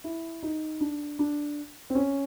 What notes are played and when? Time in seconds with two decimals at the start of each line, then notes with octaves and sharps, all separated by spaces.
0.04 E4
0.43 D#4
0.81 D4
1.19 D4
1.90 C4
1.95 C#4